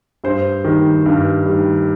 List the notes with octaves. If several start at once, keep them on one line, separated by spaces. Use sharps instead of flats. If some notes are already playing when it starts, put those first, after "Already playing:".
G2 C5
D#3 G3
G2
D#3 G3